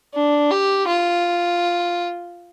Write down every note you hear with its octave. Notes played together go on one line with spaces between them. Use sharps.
D4
G4
F4